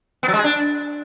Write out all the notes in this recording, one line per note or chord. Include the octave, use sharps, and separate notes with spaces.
B3
F#3
G#3
G#4
D4